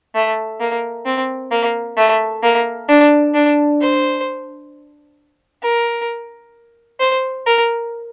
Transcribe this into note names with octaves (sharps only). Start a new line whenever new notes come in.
A3
A#3
C4
A#3
A3
A#3
D4
D4
C5
A#4
C5
A#4